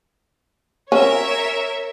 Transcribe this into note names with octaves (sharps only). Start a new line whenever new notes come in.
C#4 A#4 C#5 E5